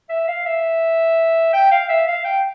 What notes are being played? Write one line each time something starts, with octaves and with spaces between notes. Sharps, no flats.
E5
F5
E5
G5
F5
E5
F5
G5